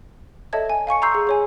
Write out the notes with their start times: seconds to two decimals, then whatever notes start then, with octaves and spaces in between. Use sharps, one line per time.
0.53 A4 C#5 D#5 E5 A5 G#6
0.70 G#5
0.87 F5 G#5 C#6 C#7
1.02 A#5 C6 C#6 E6 G6 C7
1.15 G#4
1.27 G#4 C#5 G#5